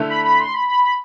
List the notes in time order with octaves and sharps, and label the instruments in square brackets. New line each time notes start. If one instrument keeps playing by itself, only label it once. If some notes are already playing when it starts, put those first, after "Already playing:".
Already playing: [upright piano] D3 A3 E4
[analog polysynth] B5
B5
C6
B5
B5
B5